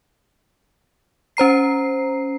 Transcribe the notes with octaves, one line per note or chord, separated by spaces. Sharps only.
C#4 C5 A#5 C7